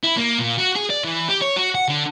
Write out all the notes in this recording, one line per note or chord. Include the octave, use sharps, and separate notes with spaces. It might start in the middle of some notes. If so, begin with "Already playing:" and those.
E4
A#3
A#2
F#4
G#4
D5
E3
G4
C#5
F#4
F#5
D3